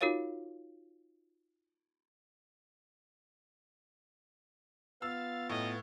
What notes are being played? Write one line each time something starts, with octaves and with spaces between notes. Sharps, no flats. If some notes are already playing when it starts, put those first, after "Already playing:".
D#4 F4 F#4 A#4 C#5 F5
B3 F4 F5 E6 A6
A2 C#4 D#5